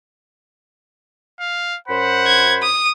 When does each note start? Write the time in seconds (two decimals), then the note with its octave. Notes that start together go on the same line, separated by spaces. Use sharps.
1.40 F5
1.88 F#2 C5 F#5 B5
2.26 G#6
2.62 D#6